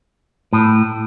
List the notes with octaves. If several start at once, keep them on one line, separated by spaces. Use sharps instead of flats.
A2